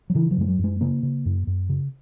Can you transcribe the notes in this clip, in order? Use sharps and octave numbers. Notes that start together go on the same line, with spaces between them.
F#3
C#3 E3
F#3
F#2 G#3
F#3
F#2
G#3
C#3 A#3
C#3
F#2
F#2
C#3